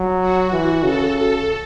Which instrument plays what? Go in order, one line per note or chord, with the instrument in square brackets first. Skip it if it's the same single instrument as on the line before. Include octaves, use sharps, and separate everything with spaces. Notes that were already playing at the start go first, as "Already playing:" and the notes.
Already playing: [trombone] F#3
[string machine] F#4
[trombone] E3
[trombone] C#3 [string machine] A4
[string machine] A4